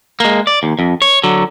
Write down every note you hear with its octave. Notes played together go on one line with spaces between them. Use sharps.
G#3 A#3
D5
D#2
F2
C#5
D3 F#3